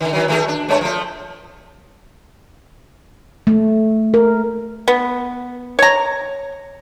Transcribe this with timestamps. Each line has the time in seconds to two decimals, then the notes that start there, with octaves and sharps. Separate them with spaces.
0.01 D3 D#3
0.13 D#3 F#3
0.28 D#3 A3 G#4
0.48 D4
0.69 G2 G#3 C#5
0.81 F3 A3
3.47 A3
4.14 A#4
4.88 B3
5.79 C#5 A#5